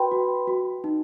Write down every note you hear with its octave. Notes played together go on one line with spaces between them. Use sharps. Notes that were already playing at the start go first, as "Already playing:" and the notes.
Already playing: F#4 B4 G5 B5 C6
F#4
F#4
D#4